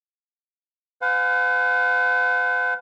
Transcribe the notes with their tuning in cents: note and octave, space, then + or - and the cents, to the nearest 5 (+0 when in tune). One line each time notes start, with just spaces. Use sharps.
B4 +45 F5 +45 G#5 -15